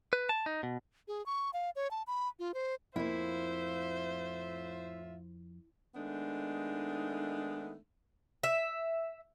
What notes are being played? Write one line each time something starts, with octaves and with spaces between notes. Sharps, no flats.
B4
A5
D#4
B2
G#4
C#6
F5
C#5
A5
B5
F4
C5
F2 A2 A#3 E4 F4 C5 E5
D#3 G#3 A3 B3 D4 D#4
E5